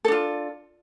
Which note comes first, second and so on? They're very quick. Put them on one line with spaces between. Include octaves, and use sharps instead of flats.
A4 D4 F4